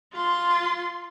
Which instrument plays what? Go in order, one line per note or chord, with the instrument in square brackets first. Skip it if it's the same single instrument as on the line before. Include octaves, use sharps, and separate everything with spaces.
[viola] F4 C6